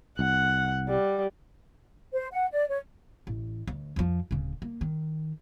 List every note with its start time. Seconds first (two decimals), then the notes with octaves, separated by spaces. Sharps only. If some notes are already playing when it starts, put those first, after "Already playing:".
0.19 C2 F#5
0.88 G3
2.13 C5
2.32 F#5
2.52 D5
2.69 C#5
3.27 A1
3.67 D2
3.96 F2 F3
4.31 D1 C#3
4.62 A#3
4.81 D#3